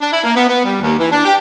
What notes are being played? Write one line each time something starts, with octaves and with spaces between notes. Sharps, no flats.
D4
E4
A#3
B3
B3
G3
D#2
E3
D4
G4